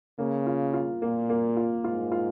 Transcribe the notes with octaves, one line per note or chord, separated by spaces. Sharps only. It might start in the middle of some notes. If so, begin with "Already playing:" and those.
C#3 A#3
F4
F4
A#2 A#3
A#3
F4
G#2 F4
F4